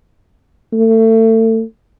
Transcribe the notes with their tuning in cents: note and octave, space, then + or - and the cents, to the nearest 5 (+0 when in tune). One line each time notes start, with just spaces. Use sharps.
A3 +30